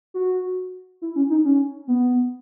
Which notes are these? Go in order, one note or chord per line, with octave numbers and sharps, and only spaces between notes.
F#4
E4
C#4
D#4
C#4
B3